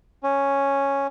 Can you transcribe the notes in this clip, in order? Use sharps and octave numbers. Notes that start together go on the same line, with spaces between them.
C#4